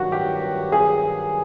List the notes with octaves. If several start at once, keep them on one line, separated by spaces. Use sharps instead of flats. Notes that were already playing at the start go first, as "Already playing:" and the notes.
Already playing: G2 D#3 F#3 F#4
G4
G#4